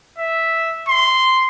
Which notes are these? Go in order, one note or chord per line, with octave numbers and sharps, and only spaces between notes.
E5
C6